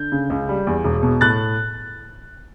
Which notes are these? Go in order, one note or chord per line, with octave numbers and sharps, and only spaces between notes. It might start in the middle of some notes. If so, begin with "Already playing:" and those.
Already playing: D3 G6
C#3
C#2
G3
E2
E1
B2
A2 F#6 A6